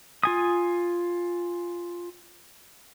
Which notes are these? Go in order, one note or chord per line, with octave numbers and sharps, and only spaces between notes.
F4 G#5 D#6